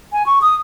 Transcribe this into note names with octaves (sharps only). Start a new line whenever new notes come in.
G#5
C#6
D#6